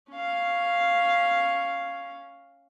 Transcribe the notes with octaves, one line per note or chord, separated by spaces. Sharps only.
C#4 F5